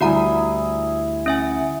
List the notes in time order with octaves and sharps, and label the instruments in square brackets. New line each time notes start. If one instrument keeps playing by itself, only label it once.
[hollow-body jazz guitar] D2 G3 [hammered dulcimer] E4 G#4 [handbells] F#4 F#5 A#5
[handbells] C#4 E5 G#5